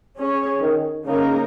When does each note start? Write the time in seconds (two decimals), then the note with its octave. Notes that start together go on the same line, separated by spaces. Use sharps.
0.16 C#4 G#4 C#5
0.61 D#3
1.06 C#3 A#3 D#4 A#4